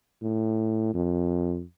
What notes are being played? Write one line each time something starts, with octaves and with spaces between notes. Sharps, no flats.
A2
F2